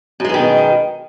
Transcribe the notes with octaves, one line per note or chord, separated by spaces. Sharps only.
F#2 B2 D#3 E3 G#3